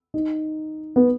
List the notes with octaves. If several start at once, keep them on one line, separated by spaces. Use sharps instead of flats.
D#4
B3